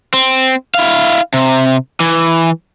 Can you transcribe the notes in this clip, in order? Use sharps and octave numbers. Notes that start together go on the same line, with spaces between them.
C4
E4 F5
C3
E3